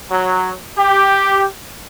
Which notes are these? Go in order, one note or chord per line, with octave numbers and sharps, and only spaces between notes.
F#3
G4